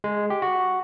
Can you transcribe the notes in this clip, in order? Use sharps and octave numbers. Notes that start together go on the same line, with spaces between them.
G#3
G4
F#4